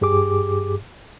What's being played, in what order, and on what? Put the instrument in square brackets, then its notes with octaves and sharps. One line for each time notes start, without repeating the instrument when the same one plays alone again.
[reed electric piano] G2 G4 G#4 D6